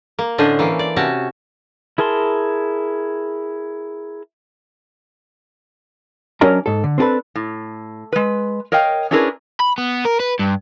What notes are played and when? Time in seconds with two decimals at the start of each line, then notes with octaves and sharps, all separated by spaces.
0.19 A#3
0.38 A2 D3 C#4 D4 C5 D#5
0.59 E3 A#3
0.79 D5
0.96 C3 C#4 F#4 A5
1.98 E4 G#4 A#4 A5 C6
6.41 F#3 C#4 D4 A#4 D#5 A#5
6.66 G#2 A4
6.84 D3
6.98 C4 D4 F#4 A4 B4
7.35 A2
8.12 G#3 B4
8.72 A#4 C#5 D#5 F5 G5
9.11 C#4 D4 E4 G#4 A#4 B4
9.60 B5
9.78 B3
10.05 A#4
10.20 B4
10.39 G2